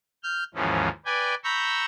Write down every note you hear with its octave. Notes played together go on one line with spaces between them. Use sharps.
F6 G6
D#2 G#2 E3 F3 C#4
B4 D5 G5 G#5
A#5 B5 C#6 E6 G6